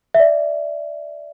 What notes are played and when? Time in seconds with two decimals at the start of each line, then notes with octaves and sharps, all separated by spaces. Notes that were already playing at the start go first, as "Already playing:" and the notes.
0.15 E5
0.20 D5